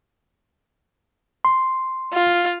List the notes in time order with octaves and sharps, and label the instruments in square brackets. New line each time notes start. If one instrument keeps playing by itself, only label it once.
[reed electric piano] C6
[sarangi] F4